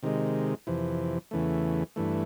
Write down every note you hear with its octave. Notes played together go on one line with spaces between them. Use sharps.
C3 D#3 G#3
F2 C3 E3
E2 C#3 E3 A3
G2 E3 A3